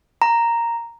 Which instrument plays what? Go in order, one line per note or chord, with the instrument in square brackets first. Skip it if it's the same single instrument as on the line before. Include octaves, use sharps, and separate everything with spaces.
[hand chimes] A#5